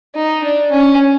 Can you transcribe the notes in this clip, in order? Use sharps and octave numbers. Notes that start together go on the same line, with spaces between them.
D#4
D4
C#4